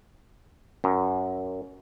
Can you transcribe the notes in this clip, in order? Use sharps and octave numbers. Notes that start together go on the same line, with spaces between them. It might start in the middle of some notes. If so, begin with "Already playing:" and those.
F#2